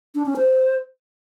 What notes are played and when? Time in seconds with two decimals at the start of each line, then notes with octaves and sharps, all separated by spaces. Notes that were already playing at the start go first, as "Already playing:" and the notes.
0.15 D4
0.26 C#4
0.37 C5